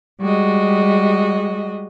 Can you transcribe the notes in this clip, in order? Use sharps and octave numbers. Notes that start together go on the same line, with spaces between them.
G3 G#3 F#4 D#5